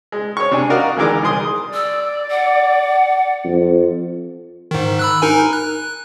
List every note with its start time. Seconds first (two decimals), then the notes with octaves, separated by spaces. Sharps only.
0.12 G#3
0.37 C#5 C#6
0.51 C3 D4 G#5
0.70 F#4 A#4 D5 D#5 F5
0.96 D2 D#3 E3 G#3 A#4 D6
1.23 C2 G#4 C6 D#6
1.74 D5 E6
2.31 F#5
3.44 F2
4.71 G#2 D#3
4.99 B5 E6 F#6
5.22 D#4 A#4 G#5
5.53 F#6